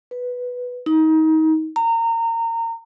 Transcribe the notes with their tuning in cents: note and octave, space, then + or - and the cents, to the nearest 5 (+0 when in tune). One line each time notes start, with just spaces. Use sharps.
B4 +0
D#4 +25
A#5 -25